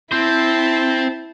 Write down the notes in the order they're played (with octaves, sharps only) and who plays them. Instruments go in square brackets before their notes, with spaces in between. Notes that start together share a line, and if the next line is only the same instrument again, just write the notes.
[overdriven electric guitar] C4 C5 [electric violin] E4 A5